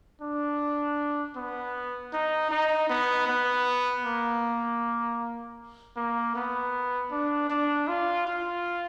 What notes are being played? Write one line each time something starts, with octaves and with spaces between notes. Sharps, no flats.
D4
B3
D#4
D#4
B3
B3
A#3
A#3
B3
D4
D4
F4
F4